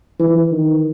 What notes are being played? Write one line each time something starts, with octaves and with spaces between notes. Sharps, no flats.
E3
D#3